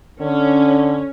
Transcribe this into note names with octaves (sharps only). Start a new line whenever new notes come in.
D3 C#4